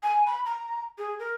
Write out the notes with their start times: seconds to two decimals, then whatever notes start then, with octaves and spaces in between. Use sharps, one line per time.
0.03 G#5
0.26 B5
0.45 A#5
0.98 G#4
1.19 A#4